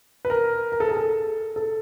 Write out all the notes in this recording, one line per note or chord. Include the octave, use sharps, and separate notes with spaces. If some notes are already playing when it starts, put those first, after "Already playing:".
B4
A#4
A#4
A4
G#4
A4
A4